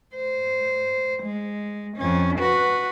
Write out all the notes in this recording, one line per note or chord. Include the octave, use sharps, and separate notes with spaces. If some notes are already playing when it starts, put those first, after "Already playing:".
C5
G#3
F2 C#4
F#4 B4